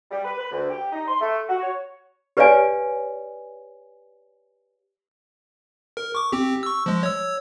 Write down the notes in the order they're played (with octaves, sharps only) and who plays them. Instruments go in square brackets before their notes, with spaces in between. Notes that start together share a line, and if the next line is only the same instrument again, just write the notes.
[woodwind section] G3
B4
B4
D2
G4
D#4
C6
A3
F#4
C#5
[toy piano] G4 B4 C#5 D5 F5 G#5
[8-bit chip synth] A#4
C#6 D6
C4 G4
C#6 E6
F3 G#3
C#5 E6